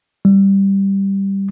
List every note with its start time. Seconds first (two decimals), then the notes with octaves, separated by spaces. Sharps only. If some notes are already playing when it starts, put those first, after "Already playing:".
0.25 G3